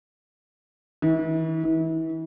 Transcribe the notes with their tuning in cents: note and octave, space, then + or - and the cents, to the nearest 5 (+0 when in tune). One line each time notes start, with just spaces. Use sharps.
E3 -40
E3 -35